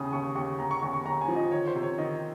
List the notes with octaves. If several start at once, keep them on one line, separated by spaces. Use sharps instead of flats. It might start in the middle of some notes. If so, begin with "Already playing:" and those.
Already playing: D#2 C#3 D#6
D#2 C#6
D#2 C#6
D#2 A#5
C#6
D#2 C#6
C#6
D#2 A#5
G#5
F3
D#5
D#3 C#5
C5
C3
C#5
D#3 D#5